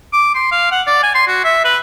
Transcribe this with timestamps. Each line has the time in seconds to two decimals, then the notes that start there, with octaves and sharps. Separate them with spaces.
0.13 D6
0.35 C6
0.51 F5
0.72 F#5
0.87 D5
1.03 G#5
1.15 C6
1.28 F#4
1.44 E5
1.64 B4